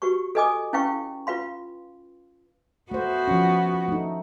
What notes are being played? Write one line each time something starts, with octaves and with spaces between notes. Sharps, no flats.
F#4 G4 B4 C#6
A4 B4 D#5 G#5 D6 D#6
C#4 E4 B4 F5 G5 C#6
F4 B4 F5 C6
A3 B3 F#4 C5
F3 C#4
A3 D#4